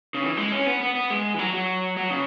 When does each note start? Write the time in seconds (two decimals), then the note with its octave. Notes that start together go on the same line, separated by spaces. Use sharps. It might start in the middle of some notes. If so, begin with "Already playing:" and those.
0.14 C#3
0.23 E3
0.37 G#3
0.52 C#4
0.67 B3
0.81 B3
0.95 B3
1.10 G#3
1.34 E3
1.39 F#3
1.53 F#3
1.97 F#3
2.10 C#3